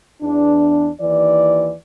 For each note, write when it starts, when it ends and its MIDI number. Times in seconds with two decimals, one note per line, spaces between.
0.22 0.90 40
0.22 0.90 62
1.00 1.74 39
1.00 1.74 52
1.00 1.74 74